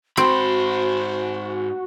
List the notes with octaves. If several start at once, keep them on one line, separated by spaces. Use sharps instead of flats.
G#2 C4 F#4 C5 B5